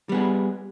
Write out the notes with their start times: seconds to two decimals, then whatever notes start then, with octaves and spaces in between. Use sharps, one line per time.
0.09 G3
0.12 B3
0.14 G#4